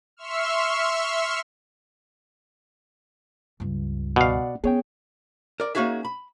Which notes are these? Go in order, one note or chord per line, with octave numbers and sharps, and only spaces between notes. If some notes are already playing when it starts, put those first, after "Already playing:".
E5 C6 C#6 E6 F6
C#2 G2
B2 D5 F5 F#5
B3 C#4 G#4 C#5 G5
A#4 D5
A#3 C#4 D#4 F#4 G#4 E5
B5